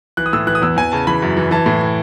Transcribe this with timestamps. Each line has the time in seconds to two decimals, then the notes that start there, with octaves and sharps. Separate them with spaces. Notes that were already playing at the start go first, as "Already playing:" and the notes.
0.17 E3 F#6
0.26 D#6
0.33 A2 E6
0.47 E3 F#6
0.55 D#6
0.62 E2 E6
0.77 E2 G#5
0.92 C#3 A5
1.07 E3 B5
1.22 F#2
1.37 E3
1.51 E3 A5
1.66 A2
1.81 E3